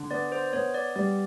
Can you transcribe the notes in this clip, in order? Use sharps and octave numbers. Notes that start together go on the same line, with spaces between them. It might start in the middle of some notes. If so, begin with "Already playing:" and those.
Already playing: D3
B3 D5
C5
B3 C#5
D5
G3 D5